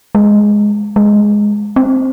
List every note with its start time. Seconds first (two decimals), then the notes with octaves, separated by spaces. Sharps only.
0.15 G#3
0.96 G#3
1.76 C4